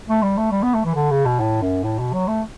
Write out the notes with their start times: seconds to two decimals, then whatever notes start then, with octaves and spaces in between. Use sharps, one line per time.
0.08 A3
0.22 G3
0.37 A3
0.52 G3
0.63 B3
0.74 A3
0.85 E3
0.95 D3
1.11 C#3
1.25 B2
1.40 A2
1.62 F#2
1.83 A2
1.99 B2
2.13 F#3
2.28 A3